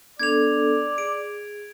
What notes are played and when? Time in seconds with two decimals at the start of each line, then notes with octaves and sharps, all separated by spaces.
0.20 B3 D4 A4 D5 G#6 F7
0.98 G#4 D7